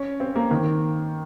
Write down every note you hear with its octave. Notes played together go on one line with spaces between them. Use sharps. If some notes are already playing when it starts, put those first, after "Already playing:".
Already playing: C#4
C4
A#3
D#3